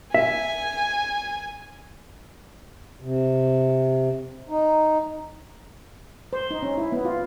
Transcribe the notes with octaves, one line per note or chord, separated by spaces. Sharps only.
E5 G#5
C3
D#4
C5
D#4
C#4
E4
B3
F4